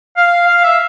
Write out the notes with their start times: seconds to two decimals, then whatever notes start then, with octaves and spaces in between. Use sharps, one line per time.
0.17 F5
0.47 F5
0.63 E5